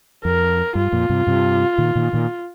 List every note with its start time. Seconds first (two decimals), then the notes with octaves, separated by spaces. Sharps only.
0.25 F2 A#4
0.75 G2 F4
0.92 F2 A#2
1.10 G2 C3
1.27 G2 C3
1.78 A#2 D#3
1.95 A#2 D#3
2.13 A#2 D#3